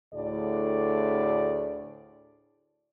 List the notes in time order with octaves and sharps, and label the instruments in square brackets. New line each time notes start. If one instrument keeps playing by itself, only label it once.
[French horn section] D2 A2 D3 G#4 D5